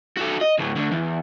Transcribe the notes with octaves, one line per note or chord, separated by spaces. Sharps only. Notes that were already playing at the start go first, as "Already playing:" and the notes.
F#4 A4
D#5
D2 A2
D2 D3
E2